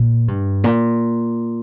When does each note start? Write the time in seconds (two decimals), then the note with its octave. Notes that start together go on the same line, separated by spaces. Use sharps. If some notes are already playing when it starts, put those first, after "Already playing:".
Already playing: A#2
0.28 G2
0.64 A#2